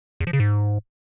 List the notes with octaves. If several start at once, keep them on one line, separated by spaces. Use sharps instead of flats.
E2
F3
C#3
G#2